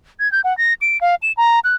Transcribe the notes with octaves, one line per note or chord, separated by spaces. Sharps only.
G#6
G6
F#5
A#6
D7
F5
E7
A#5
F#6